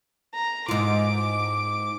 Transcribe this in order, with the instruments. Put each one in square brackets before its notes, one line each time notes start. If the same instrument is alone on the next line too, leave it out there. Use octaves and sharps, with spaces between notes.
[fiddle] A#5
[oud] G#2 F4 [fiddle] D6